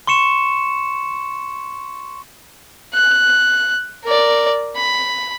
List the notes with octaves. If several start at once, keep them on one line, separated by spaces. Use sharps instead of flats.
C6 C#6 C#7 E7
F#6
A#4 D5
B5